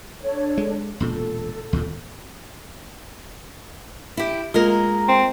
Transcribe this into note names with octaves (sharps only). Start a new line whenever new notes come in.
D4 A4 C#5
G#3
E1 A#2 A4
D#2 A#2
E4 G4
G#3 A#3 F4 A#4
A#5
C4